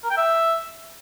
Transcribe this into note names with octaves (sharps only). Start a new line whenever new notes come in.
A#4
G5
E5